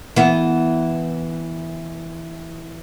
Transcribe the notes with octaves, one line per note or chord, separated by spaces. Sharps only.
E3 B3